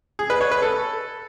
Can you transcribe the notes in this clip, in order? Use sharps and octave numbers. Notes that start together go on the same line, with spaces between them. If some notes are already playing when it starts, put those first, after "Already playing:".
G#4
B4
C#5
B4
A4